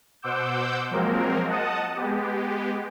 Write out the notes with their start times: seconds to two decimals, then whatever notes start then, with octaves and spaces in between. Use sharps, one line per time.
0.22 B2 C5 F#5 D6 E6 G6
0.90 F3 F#3 G#3 A#3 C4 A#4
1.47 D#5 F#5 A5 D#6
1.95 G#3 B3 G4